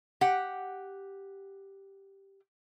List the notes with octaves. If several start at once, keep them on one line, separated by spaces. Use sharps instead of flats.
G4 F#5